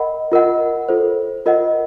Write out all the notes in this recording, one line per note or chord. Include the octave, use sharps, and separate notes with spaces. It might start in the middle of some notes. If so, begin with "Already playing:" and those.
Already playing: A#4 D#5 F#5 B5
F4 A#4 D#5 F#5
F4 A4 C5
F4 A#4 D#5 F#5